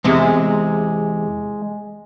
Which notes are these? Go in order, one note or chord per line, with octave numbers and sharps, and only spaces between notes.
E2 C3 G#3